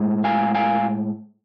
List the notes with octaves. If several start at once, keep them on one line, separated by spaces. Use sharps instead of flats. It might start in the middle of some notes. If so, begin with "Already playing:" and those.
Already playing: A2 G#3
F5 G#5
F5 G#5